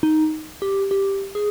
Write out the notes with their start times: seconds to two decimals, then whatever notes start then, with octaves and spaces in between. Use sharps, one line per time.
0.03 D#4
0.62 G4
0.91 G4
1.35 G#4